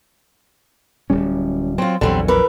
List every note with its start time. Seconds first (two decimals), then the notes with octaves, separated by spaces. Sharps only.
1.10 D1 G3 C#4
1.78 F#3 C4 F4
2.01 A#1 E2 D3 F#3 G3 C4
2.28 E3 A#4 B4